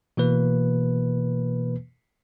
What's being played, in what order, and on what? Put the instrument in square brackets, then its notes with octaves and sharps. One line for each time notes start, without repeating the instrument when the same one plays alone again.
[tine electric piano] B2 E3 A#3 B4